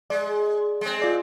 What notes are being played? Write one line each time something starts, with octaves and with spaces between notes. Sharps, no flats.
G#3 D5
G#3 C4
F4 D5